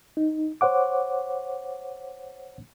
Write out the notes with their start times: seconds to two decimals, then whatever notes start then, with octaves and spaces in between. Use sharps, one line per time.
0.17 D#4
0.61 C5 C#5 F#5 D6